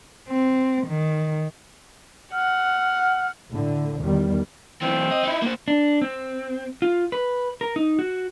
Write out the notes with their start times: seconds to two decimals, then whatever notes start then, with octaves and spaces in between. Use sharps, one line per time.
0.29 C4
0.87 D#3
2.33 F#5 F6
3.51 A2 D3
4.01 E2 D#3 G3
4.81 B1 E3 C4
5.11 D#5
5.24 D#4 E4
5.42 A#3 C5
5.68 D4
6.02 C4
6.82 F4
7.12 B4
7.61 A#4
7.76 D#4
7.99 F#4